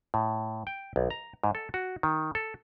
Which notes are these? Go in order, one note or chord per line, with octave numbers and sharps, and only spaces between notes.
A2
G5
B1
A#5
G#2
A4
F#4
D#3
A4